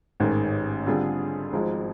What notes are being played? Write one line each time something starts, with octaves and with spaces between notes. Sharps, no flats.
A1 G#2 D#3
D3 G3 C4 F4 G#4
G#1 G#2 F3 G#3